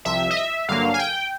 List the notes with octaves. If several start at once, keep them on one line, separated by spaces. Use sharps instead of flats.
C2 C3 F3 E5
D#5
E5
G2 D3 F#3 A#3 F5
G#5
G5